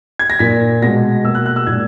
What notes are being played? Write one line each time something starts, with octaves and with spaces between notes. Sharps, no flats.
G#6
A#6
A#2 A#3 B6
B2 G#3 A#6
B2 A#3 E6
F#6
F#6
E6
A#2 G#3 G#6